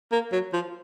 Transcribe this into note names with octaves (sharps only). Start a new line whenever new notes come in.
A#3
F#3
F3